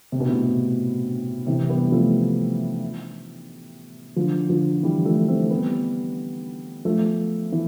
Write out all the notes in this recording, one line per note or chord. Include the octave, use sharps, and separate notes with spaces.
C3
B2
A2 C3
C3 E3
G3 B3
F3 A3
D3 F3
D3 F3
E3 G3
F3 A3
A3 C4
G3 B3
F3 A3
E3